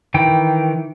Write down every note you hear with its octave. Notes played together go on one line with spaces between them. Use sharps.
D#3 E3 G5